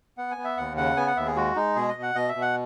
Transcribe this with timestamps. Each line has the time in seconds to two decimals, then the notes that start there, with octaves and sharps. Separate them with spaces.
0.18 B3 F#5
0.31 G#5
0.37 B3
0.44 E5
0.57 D#2 F#5
0.77 C#3 F#5
0.97 B3 G#5
1.07 F#5
1.17 D#2 E5
1.27 G#4
1.36 G#3 F#4
1.56 G#3 D#4
1.76 B2 G#4
1.89 D#5
1.95 B2
2.03 F#5
2.15 B2 D#5
2.29 E5
2.35 B2
2.42 F#5